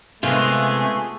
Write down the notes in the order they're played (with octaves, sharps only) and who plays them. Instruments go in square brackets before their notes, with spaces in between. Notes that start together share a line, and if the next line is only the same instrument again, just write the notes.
[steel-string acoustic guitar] C3 [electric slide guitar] G#3 B3 F4 [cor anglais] A3 [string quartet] G#4